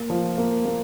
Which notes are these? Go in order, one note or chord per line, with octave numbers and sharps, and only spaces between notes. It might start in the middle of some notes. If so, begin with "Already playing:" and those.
Already playing: A#3
F3
A#3
A#3